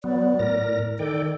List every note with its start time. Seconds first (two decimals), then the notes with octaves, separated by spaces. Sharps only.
0.04 F#3 B3 D5
0.39 A2 A#4 A#6
0.99 D#3 A4 D5 G5